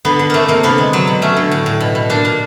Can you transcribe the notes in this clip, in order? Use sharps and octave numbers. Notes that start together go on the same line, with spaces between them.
D3 B3
D3
C3 A3 A#3
C3 A#3
D3 B3
G#3
F#3
B2
A3 C#4
D3
A2
A2
B2
B2
A#2 D4
A#2